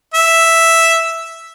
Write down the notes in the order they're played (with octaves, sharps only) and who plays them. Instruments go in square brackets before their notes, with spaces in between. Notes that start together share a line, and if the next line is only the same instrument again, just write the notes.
[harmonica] E5